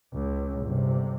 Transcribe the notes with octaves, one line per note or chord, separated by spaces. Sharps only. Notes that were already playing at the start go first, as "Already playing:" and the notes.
C#2
G1 C3